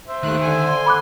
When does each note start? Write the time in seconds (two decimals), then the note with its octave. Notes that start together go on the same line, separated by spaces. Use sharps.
0.08 C5 E5
0.23 D#2 D#3 A3 F#6
0.42 D3 G#5
0.69 C6
0.86 B5 D6 F#6